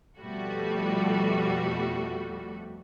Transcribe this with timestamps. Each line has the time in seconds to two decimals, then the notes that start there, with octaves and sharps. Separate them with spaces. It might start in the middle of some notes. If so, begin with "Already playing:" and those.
0.19 F2 B2 G3 A3 F#4